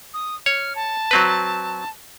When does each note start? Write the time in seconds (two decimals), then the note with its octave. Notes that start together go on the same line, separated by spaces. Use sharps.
0.14 D#6
0.46 C#5 F6
0.76 A5
1.11 F#3 C4 B4